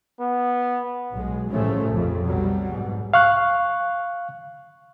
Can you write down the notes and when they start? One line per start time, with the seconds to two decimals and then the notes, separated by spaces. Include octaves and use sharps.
0.21 B3
1.12 B1 G#3
1.51 A1 G2 C#3 F3 A3 C#4
1.91 A#1 F2
2.24 B1 B2 F#3 G3
2.69 G#2 B2
3.14 F5 C#6 F#6